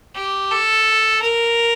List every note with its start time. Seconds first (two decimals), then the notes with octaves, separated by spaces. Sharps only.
0.16 G4
0.51 A4
1.22 A#4